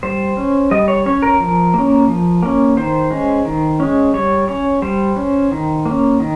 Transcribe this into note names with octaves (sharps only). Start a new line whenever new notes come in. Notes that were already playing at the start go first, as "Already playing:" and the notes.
G3 C5
C#4
G3 D#5
C#5
C#4 C#5
A#4
F3
A#3 C#4
F3
A#3 C#4
D#3 C5
G#3 C#4
D#3
G#3 C#4
G3 C#5
C#4 C#5
G3 C5
C#4
D#3
A#3 C#4
D#3